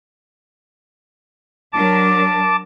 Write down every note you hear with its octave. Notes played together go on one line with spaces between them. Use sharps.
F#3 D4 A#4 A5 D6